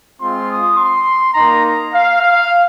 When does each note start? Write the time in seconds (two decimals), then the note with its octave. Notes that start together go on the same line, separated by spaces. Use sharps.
0.20 G#3 C4 F4 C6
0.49 D#6
0.77 C6
1.34 A#3 D#4 A#5
1.93 F5
2.21 F5